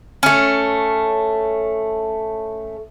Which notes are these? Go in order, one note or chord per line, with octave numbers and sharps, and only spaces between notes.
A3 C#4